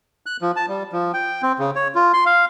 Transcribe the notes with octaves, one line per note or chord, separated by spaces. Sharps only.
F#6
F3
A5
G3
F3
G5
C4
C#3
C#5
F4
C6
F5